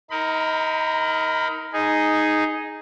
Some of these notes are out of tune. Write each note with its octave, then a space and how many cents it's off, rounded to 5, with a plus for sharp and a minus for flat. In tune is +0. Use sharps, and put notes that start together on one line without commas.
D#4 +25 A#4 +0 B5 +30
D#4 +0 G#4 +0